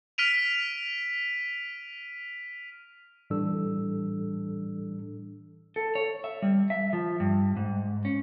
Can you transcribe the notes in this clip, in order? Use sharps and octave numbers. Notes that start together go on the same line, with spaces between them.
F6 B6 D7 D#7 F7
A2 E3 G3 D4 A4 E6
A4
C#5
E5
G3
E5
F3
G2
G#2
C#4